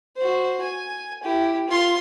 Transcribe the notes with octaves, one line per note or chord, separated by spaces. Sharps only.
F#4 C5
G#5
E4 G4
F4 C6